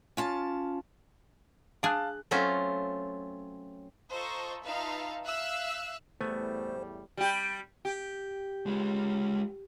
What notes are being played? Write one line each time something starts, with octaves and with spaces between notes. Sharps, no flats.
C#4 F4 A5
D4 G#4 F5 A5 F#6
F#3 A3 C4 C#4 F4
F4 A4 C5 D#5 A#5 C#6
D#4 F4 B4 E5 F5 A5
E5 F5 E6 F#6
E2 A2 G3 A3 B3 C5 G#5
G3 G4
G4
G#3 F4